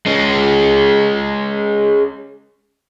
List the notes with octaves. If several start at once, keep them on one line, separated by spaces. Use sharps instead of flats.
G#3 C#4